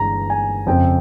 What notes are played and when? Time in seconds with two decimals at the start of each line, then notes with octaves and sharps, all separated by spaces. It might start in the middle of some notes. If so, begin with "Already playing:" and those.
Already playing: G1 G2 E3 G#3 A#5
0.30 G#5
0.67 F2 C#3 F3 C4 G5